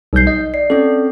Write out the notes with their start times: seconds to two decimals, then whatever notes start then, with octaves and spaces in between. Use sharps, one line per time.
0.13 B1 G3 D#4 G6 C7
0.27 D#5
0.54 D5 C7
0.70 C4 C#4 A4